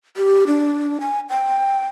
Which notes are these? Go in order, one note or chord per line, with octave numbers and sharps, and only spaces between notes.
G4
D4
G#5
G5